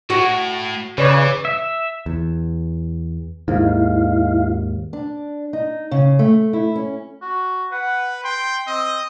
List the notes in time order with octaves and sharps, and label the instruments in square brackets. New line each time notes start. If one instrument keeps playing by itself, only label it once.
[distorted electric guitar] A2 [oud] F#4
[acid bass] C#3 [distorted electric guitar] E3 [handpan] B4 C#5 D5
[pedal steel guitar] E5
[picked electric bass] E2
[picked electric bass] D#2 G#2 [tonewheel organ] D#4 E4 F5
[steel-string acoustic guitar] D4
D#4
C#3
A3
E4
C#4
[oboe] F#4
[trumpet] B4 [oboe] F#5
[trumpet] G5 [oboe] C6
[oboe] C4 [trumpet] D#5